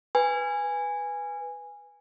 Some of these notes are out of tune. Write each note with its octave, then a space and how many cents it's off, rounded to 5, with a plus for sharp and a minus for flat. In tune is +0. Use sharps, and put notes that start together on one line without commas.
B4 +0 G#5 -10